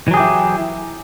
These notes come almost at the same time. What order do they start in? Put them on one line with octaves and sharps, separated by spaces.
E3 F#3 G#4 G4 E4